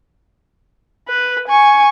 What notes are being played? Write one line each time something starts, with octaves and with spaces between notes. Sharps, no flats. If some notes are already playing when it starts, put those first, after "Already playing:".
B4
G#5 C#6